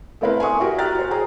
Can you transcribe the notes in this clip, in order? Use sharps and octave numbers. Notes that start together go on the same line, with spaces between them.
A3 B3 C4 E4 A#4 B4
G#5 C6 C#6 D#6
E4 F#4 G4 A#4
G5 A#5 F6 F#6 A6
F#4 C5
G#4 C#5 G5 A#5